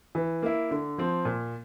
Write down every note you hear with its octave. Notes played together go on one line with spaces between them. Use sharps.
E3
A#3 E4
D3
F3 C4
A#2